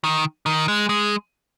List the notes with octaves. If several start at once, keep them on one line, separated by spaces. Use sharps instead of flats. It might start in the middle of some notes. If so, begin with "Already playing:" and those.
D#3
D#3
G#3
G#3